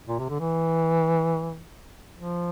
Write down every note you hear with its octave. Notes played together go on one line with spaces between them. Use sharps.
A#2
C3
D3
E3
F3